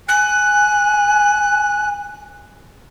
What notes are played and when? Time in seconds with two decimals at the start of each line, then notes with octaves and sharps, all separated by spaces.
0.08 G#5 F#6